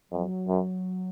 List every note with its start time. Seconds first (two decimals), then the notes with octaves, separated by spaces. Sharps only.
0.12 F2 F#3
0.48 F#2